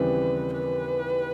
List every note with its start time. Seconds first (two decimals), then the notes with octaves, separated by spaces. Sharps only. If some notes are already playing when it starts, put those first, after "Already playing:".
Already playing: D#2 C#3 E3 G3 C4 B4
0.53 B4